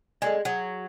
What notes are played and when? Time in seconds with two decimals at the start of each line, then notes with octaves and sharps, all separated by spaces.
0.22 G#3 A4 D5 D#5
0.45 F#3 G#4